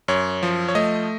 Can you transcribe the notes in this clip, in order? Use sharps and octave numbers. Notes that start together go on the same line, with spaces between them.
F#2 C#5
F3
C#5
A3 D#5